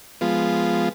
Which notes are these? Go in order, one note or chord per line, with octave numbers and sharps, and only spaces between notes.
F3 G#3 B3 F4